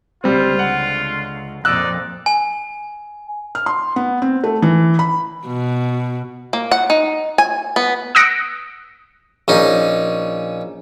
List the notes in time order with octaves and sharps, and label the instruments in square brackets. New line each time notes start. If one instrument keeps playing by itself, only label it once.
[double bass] C#2 D3 [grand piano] G3 C4 [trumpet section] F4
[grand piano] F#5
[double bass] F2 A#2 [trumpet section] D#4 D5 [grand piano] E6 F#6
[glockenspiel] G#5
[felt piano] F6
C6
B3
C4
A3
E3
B5
[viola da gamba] B2
[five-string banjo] A#3
F#5
D#4
G#5
B3
[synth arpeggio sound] D#6 E6 F#6 A#6 C#7 D7
[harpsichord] A#1 C#4 D#4